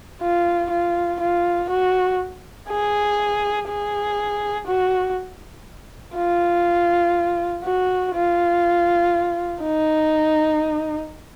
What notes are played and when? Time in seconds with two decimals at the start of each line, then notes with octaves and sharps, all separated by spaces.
0.21 F4
0.70 F4
1.20 F4
1.70 F#4
2.69 G#4
3.68 G#4
4.67 F#4
6.16 F4
7.64 F#4
8.14 F4
9.62 D#4